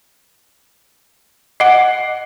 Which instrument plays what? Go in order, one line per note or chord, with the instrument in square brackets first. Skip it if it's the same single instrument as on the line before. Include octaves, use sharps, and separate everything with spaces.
[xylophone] D#5 D6 D7 [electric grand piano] F#5 C7